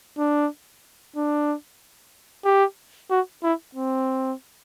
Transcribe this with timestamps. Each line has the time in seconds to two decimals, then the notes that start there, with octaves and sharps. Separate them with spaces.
0.18 D4
1.16 D4
2.45 G4
3.11 F#4
3.43 E4
3.75 C4